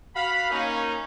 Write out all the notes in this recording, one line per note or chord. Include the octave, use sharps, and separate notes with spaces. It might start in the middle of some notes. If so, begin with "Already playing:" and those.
F#4 F5 B5
A#3 C#4 D#4